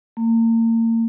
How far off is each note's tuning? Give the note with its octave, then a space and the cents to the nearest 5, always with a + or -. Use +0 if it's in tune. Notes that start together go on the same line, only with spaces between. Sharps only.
A#3 -35